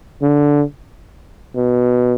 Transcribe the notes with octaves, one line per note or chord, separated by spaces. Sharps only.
D3
B2